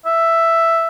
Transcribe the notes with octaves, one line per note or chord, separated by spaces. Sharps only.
E5